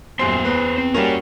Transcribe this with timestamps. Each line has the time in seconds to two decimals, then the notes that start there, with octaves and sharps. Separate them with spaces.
0.19 D#1 F#2 B3 C5 C6
0.45 E2 B4
0.78 C4
0.94 G3 A#3 C#4 F#4 A#4